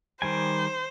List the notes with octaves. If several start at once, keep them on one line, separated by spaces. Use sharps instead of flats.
D#3 G3 C5 G#5